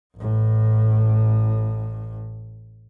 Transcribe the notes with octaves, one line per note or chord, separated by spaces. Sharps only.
A1 A2